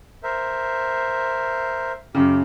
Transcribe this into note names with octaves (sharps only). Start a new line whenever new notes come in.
A#4 C5 E5
F#2 C#3 G4